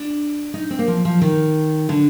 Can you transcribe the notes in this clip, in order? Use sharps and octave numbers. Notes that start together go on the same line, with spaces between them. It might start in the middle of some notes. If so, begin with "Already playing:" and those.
Already playing: D4
D#4
C4
A#3
F3
F3
D#3
D3